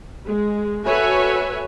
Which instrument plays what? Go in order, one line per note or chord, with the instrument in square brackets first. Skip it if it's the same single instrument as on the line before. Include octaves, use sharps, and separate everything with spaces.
[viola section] G#3
F#4 A4 B4 C#5 E5 G#5